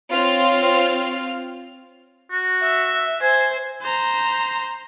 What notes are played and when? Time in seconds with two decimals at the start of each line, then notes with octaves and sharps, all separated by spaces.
0.11 C4 F4 C#5 F6
2.32 F#4
2.62 E5
3.22 C5 G#5
3.82 C5 A#5